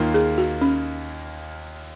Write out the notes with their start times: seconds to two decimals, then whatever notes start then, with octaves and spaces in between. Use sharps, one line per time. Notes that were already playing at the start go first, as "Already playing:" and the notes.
Already playing: D#2 D#3 A#3 F4
0.14 G#4
0.38 F#4
0.61 C#4